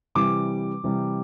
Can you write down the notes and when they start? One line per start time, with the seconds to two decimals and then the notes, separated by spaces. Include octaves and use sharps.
0.15 C3 E3 G3 D6
0.84 C3 E3 G3